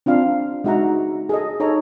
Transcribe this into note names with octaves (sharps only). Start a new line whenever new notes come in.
C4 D4 F4 F5
G#3 D#4 F#4 E5 F#5 A#5
G#4 A4 D#5
D#4 A4 C#5 A#5